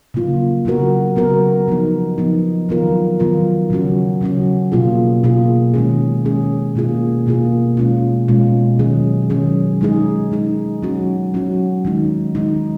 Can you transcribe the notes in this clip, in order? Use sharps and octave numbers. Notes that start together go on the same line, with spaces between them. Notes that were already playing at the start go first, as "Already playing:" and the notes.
C#3 F#3 A#3 F4
C#3 F#3 B3 F#4 A#4
C#3 F#3 B3 F#4 A#4
F3 B3 D#4
F3 B3 D#4
D#3 F#3 B3 F4 A#4
D#3 F#3 B3 F4 A#4
C#3 F#3 C#4 F#4
C#3 F#3 C#4 F#4
B2 A#3 F4 G#4
B2 A#3 F4 G#4
D#3 G#3 C#4 G#4
D#3 G#3 C#4 G#4
B2 A#3 F4 G#4
B2 A#3 F4 G#4
B2 G#3 C#4 F4
B2 G#3 C#4 F4
D#3 F#3 C#4 G#4
D#3 F#3 C#4 G#4
G#3 D#4 G#4
G#3 D#4 G#4
F#3 C#4 F#4
F#3 C#4 F#4
D#3 G#3 D#4
D#3 G#3 D#4